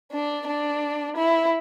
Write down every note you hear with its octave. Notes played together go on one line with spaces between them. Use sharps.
D4
D4
E4